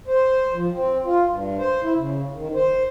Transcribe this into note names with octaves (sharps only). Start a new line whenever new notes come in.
C5
F3
C4
F4
G2
C5
E4
C#3
D#3
C5